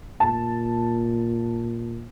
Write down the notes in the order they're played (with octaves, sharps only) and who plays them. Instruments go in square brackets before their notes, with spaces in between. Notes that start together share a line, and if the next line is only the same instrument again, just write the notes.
[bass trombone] A#2 [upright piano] A5